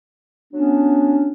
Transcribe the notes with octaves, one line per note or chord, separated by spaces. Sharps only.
F#3 B3 C#4 D4